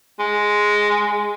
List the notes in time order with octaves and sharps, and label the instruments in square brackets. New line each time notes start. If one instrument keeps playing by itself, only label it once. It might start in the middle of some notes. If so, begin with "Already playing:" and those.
[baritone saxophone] G#3